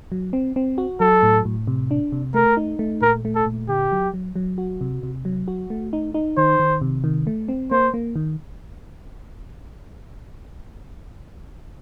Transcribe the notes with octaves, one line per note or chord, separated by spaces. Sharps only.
F#3
C4
C4
F#4
F#3 A4
A2
A2
C3
D4
C3
A3 A#4
D#4
A3
A#2 A#4
A3
A4
A#2
D3 G4
F#3
F#3
F#3
F#4
C3
C3
F#3
F#4
A3
D#4
D#4
D#3 C5
D#3
C3
D#3
A3
C4
A#3 C5
A#3
D#3